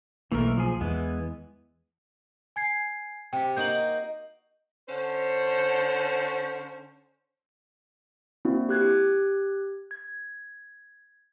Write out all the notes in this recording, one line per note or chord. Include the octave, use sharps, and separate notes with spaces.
B1 E3 A3 A#3 A#4
F3 G#4
E2 E3 G#3 B3
G#5 G#6 C7
C3 G4 G5
A#3 D#4 F#4 G6 F#7
D3 C#4 C5
A#3 C4 D4 E4 F#4
G4 F#6 G#6
G#6